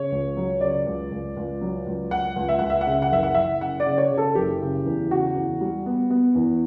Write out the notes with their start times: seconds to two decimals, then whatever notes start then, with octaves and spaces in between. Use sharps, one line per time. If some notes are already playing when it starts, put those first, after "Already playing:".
Already playing: C#3 C#5
0.12 C#2
0.37 F#3
0.61 C#3 D5
0.86 C#2
1.11 C#2
1.37 C#2
1.61 F#3
1.87 C#2
2.11 C#2 F#5
2.36 C#2
2.49 E5
2.59 C#2 F#5
2.70 E5
2.81 F#5
2.87 C#3 E5
3.02 F#5
3.11 F#1 E5
3.23 F#5
3.35 F#1 E5
3.61 C#3 F#5
3.80 D5
3.86 C#3
3.98 C#5
4.11 C#3
4.17 A4
4.35 F#1 G4
4.61 C#3
4.86 E2
5.11 C#3 F#4
5.35 E2
5.61 G3
5.86 B3
6.10 B3
6.35 E2